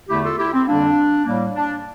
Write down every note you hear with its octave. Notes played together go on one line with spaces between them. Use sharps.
E2 D3 A3 E4 G4
F4 A4
E4 G4
C4
F2 D3 G3 A#3 D4
A2 G3 A#3
D4